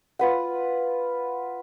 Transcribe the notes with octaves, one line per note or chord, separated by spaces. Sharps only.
F4 B4 F#5